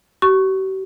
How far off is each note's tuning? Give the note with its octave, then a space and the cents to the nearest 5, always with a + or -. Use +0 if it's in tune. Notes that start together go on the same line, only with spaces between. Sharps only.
G4 -45 C#6 +0